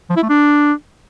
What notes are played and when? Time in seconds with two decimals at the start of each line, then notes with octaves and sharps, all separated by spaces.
0.10 F3
0.16 E4
0.23 A3
0.29 D4